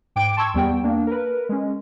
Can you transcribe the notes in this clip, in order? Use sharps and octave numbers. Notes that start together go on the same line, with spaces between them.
G#2 G5 D6 D7
A5 C6 C#6 E6 G#6
E2 G3 B3 G5
A#3 D4
A#4 B4
G#3 C#4